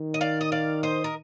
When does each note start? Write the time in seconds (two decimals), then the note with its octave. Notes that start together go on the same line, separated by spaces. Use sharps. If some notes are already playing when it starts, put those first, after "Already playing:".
Already playing: D#3
0.14 D#5
0.21 D5 F5
0.41 D#5
0.52 D5 F5
0.83 C5 D#5
1.04 A#4